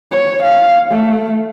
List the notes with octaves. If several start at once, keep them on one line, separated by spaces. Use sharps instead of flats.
C#5
F5
A3